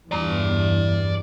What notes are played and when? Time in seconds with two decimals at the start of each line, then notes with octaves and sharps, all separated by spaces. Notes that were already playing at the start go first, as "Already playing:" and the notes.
0.11 E2 G2 E3 D5 A#5